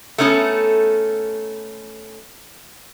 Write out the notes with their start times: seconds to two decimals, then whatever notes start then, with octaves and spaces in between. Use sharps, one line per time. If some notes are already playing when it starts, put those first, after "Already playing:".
0.18 A3 B3 C#4 D#4 A4